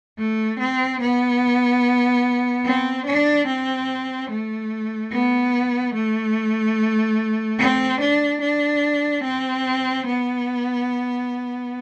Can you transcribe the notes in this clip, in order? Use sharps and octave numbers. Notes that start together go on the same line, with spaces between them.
A3
C4
B3
C4
D4
C4
A3
B3
A3
C4
D4
D4
C4
B3